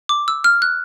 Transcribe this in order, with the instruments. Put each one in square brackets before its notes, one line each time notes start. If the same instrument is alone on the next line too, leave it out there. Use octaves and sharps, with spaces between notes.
[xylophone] D6
E6
F6
F#6